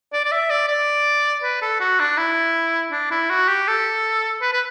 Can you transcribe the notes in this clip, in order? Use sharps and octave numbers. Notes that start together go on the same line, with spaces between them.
D5
D5
E5
D5
D5
B4
A4
F#4
D4
E4
D4
E4
F#4
G4
A4
B4
B4